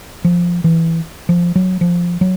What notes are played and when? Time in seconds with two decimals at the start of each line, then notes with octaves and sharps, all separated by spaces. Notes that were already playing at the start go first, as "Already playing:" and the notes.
0.25 F3
0.64 E3
1.29 F3
1.56 F#3
1.81 F3
2.21 F#3